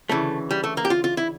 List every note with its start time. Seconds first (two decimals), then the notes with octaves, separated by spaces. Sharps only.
0.09 D2 C#3 E3 A3
0.51 G3
0.64 A3
0.77 A#3
0.85 G4
0.90 F4
1.04 F4
1.17 E4